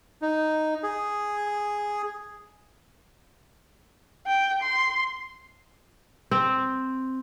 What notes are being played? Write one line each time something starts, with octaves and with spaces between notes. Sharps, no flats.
D#4
G#4
G5
C6
C4